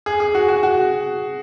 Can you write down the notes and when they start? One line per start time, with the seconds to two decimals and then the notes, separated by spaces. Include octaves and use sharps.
0.06 G#4
0.20 G#4
0.35 F#4
0.48 F#4
0.63 F#4